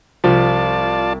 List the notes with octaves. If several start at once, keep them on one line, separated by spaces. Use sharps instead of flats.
C2 F3 F4 D5 A5 E7